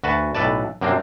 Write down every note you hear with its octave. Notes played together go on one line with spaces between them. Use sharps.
D2 F#4 B4 A5
B1 A2 A4 B4 D5 A5
F#2 C3 A#3 C4 D4